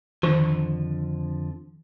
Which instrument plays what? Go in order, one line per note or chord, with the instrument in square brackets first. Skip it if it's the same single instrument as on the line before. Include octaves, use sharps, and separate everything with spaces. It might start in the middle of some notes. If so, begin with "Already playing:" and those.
[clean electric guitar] F2 D3 F3 [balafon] D#3 C5